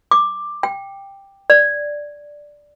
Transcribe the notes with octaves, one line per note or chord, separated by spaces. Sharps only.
D6
G5
D5